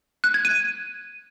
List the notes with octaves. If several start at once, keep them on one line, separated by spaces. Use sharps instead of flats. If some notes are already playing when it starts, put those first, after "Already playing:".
F#6
G#6
D#7